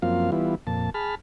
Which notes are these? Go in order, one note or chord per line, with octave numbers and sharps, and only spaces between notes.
F#2 F3 A#3 C4 F4 F5
E3 G3 B3 E4 F4
F2 A#2 A5
G#4 A5 B5 F6